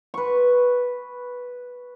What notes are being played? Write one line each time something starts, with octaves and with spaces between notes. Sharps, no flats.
B4 C#6